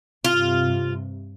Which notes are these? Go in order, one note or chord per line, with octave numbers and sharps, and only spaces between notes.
G2 C3 F4